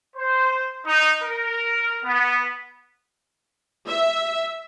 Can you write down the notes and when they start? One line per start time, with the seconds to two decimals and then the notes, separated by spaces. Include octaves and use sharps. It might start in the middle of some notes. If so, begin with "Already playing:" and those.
0.16 C5
0.87 D#4
1.23 A#4
2.04 B3
3.87 E5